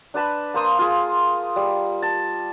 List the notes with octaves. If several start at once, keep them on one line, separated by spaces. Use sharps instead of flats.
D4 B4 A5 B5
A#3 C5 D#6
F4 G#4
G3
A5